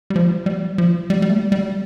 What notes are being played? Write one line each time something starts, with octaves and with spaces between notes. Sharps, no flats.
G3
F3
G3
F3
G3
G3
A3
G3